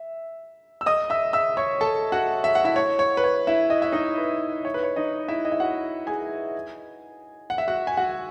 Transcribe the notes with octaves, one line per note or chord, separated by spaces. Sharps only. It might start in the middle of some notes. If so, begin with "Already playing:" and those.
Already playing: E5
E6
D#5 D#6
E5 E6
E5 E6
C#5 C#6
A4 A5
F#4 F#5
E5
F#5
E4 E5
C#5
C#5
B4
C#5
E4 E5
D#5
E5
D#4 D#5
B4
C#5
B4
C#5
D#4 D#5
E4 E5
D#5
E5
F#4 F#5
G#4 G#5
F#5
E5
F#4 F#5
G#5
F#4 F#5